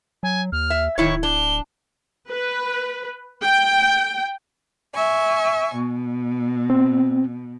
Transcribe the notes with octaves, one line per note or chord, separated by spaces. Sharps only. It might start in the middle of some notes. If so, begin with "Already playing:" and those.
F#3 G#5
D#2 F6
E5
D1 D#3 E4 C#5 C#6
D4 G7
B4
G5
E5 G#5 C#6
B2
C4